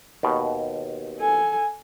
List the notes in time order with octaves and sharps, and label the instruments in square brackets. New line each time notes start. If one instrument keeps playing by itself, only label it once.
[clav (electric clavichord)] D#2 B2
[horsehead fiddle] A4 G#5